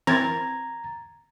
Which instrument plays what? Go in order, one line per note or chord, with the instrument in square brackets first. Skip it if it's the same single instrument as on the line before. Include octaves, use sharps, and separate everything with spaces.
[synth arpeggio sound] E3 C4 A#4 [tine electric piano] A#5 G#6 A6